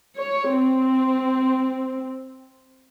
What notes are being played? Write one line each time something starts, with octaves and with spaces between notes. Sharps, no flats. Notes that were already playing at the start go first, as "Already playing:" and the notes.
C#5
C4